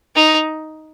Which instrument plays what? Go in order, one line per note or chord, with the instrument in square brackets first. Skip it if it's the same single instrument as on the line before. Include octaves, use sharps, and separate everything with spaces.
[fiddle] D#4